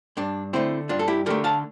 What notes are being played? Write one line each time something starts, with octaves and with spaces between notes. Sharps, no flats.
G2 D4
D3 A3 C4 E4
G2 D4 F4
A4
E4 G4
D3 A3 G4 A#4
F5 A5